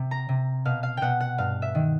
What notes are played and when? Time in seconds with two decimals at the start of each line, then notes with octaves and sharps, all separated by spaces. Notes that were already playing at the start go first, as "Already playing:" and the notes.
Already playing: C3
0.11 A#5
0.29 C3
0.65 B2 F5
0.83 F5
0.97 B2 F#5 G5
1.20 F#5
1.38 G2 F5
1.62 E5
1.75 D#3